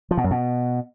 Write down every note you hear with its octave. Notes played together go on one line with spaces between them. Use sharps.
F3
B2
F#2
B2